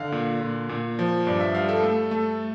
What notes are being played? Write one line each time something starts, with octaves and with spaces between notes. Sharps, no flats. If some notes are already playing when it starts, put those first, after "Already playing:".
Already playing: D3 F5
A#2
A#2
A#2
F3
G2 D5
E5
G3 F5
A4
A3
A3